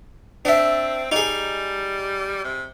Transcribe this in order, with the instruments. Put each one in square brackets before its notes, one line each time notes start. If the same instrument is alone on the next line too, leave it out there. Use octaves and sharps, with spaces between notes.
[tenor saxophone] C4 [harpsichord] D4 E5
[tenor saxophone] G3 [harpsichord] D#4 G#4
[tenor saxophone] C3